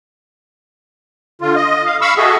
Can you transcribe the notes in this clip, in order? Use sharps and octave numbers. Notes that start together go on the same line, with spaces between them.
D3 F4
D#5
F5
F5 B5 C#6 E6
F#4 G#4 A4 D#5 E5